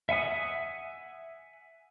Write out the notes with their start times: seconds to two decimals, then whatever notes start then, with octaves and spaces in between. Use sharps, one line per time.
0.09 E5 F#5 G#5 D#6